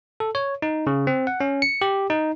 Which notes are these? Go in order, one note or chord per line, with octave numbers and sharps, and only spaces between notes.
A4
C#5
D#4
C#3
C4
F#5
C#4
C#7
G4
D#4